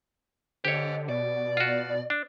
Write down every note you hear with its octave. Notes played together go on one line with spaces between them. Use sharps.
D3 G4 C5 C#5 D#5
B2 D5
F4 F#4
D4